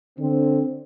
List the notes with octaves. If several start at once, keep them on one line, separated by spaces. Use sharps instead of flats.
D3 C4